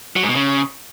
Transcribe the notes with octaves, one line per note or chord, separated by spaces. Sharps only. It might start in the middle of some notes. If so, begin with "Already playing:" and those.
F#3
G#2
B2
C#3